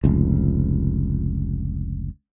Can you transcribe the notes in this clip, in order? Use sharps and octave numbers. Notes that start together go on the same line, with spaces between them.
F1 C#2